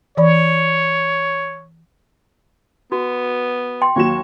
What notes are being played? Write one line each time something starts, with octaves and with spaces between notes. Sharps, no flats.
E3 C#5 D5 B5
B3 F#4
G5 C6
D#2 F#3 C#5 E7